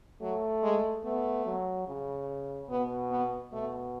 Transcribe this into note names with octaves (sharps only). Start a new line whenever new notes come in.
F#3 A3
G#3
A3 B3
F#3
C#3
B2 B3
B3
B2 A3